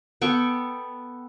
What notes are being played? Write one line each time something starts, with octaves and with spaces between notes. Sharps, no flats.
B3 A4 G5 C#6